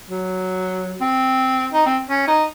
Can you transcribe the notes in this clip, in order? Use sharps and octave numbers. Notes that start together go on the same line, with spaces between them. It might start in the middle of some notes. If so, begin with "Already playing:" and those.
F#3
C4
D#4
C4
C#4
D#4